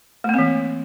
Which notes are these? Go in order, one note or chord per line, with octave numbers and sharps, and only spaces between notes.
E3 A3 A#3 C4